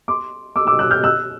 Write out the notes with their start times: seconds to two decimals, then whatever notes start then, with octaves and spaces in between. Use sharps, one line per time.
0.08 C6 D6
0.56 D6 E6
0.67 D6 E6
0.79 E6 F#6
0.91 F6 G6
1.03 E6 F#6